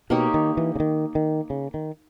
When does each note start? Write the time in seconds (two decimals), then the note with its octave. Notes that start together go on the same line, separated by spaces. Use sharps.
0.10 B2 A#3 D#4 G4 C#5
0.34 D#3
0.57 E3
0.76 C#3
0.80 D#3
1.15 D#3
1.50 C#3
1.74 D#3